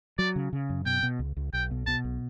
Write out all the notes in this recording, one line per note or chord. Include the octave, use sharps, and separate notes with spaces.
F#3 D5
C#3
C#3
F#2
B2 G5
B2
C#2
C#2
B1 G5
B2
B2 A5
B1